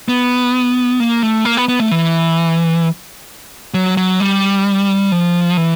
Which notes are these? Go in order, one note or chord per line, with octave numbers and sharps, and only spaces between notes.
B3
A#3
A3
A#3
B3
B3
A3
E3
F#3
F#3
G3
F3
E3